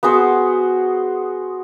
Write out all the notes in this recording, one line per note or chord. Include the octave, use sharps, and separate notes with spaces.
B3 F#4 G#4 C5